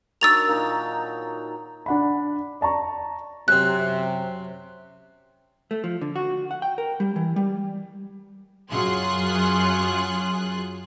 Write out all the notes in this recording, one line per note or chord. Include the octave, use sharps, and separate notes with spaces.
D#3 F#3 D4 E6 A6 F7
A#2 D#4 A5
D4 F#5 B5
D5 A5 A#5 C#6
F#2 C3 C4 F#6
A3
F3
D3
F#4
F#5
G5
A#4
G3
E3
G3
F#2 F#3 F4 G#4 C6 F#6